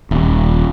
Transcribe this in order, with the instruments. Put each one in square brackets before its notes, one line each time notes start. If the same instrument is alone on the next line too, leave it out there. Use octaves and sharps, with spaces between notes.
[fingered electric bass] D#1